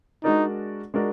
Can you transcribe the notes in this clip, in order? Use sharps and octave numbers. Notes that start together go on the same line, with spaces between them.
G#3 D4 D#4 F#4 A#4 D5
G#3 D4 F#4 A#4 D5